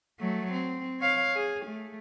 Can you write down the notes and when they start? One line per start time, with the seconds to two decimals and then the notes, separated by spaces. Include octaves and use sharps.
0.20 F#3 A3
0.53 C4
1.00 C#5 F5
1.36 G#4
1.66 A3